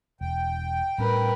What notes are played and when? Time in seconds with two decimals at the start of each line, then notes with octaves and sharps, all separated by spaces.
0.21 E1 G5
0.98 A2 G3 C#4 A#4 B4